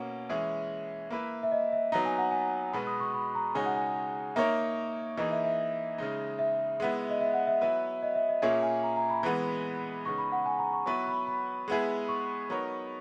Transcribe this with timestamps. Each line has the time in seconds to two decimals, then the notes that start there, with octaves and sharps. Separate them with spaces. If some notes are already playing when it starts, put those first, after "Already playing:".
Already playing: B2 A#3 C#4 F#5
0.29 E3 G#3 C#4 G#4 E5
1.11 A#3 E4 B4
1.43 E5
1.52 D#5
1.72 E5
1.92 F#3 B3 D#4 A#5
2.05 G#5
2.18 F#5
2.31 G#5
2.73 B2 G#3 B3 F#4 B4 B5
2.87 D#6
3.00 C#6
3.14 B5
3.35 A#5
3.55 C#3 G#3 D#4 F#4 C#5 G#5
3.66 F#5
3.76 G#5
4.36 A#3 D#4 A#4 C#5 E5
5.17 E3 A#3 D#4 G#4 D#5
5.31 E5
5.45 E5
5.98 C#3 G#3 D#4
6.39 E5
6.80 G#3 B3 E4
7.10 D#5
7.20 E5
7.34 F#5
7.47 E5
7.61 F#3 B3 E4 B4
8.02 D#5
8.15 E5
8.29 D#5
8.42 A#2 A#3 C#4 G#4 C#5 E5
8.63 G#5
8.83 A#5
8.97 A#5
9.10 B5
9.23 E3 G#3 B3
10.05 C#3 G#3 B3 D#4 C#6
10.18 B5
10.32 F#5
10.46 G#5
10.59 A#5
10.73 C#6
10.86 F#3 B3 E4 B4 C#6
11.07 B5
11.27 B5
11.68 G#3 B3 E4 G#4
12.08 C#6
12.49 F#3 B3 D#4 A#4 C#5